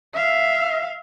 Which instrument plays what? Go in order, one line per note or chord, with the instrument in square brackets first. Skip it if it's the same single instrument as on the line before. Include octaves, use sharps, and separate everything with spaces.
[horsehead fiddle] E5 F5